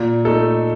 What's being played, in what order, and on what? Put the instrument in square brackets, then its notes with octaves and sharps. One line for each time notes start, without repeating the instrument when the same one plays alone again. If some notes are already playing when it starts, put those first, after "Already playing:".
Already playing: [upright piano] A#2
A3 D#4 A4